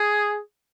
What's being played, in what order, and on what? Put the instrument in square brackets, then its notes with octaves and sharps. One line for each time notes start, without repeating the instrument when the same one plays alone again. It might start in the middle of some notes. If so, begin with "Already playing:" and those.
Already playing: [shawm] G#4